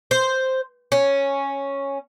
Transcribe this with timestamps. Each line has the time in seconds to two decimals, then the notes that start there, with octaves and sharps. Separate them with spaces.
0.11 C5
0.92 C#4